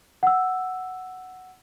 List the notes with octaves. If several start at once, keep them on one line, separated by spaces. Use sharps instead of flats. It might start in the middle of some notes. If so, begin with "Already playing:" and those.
F#5 E6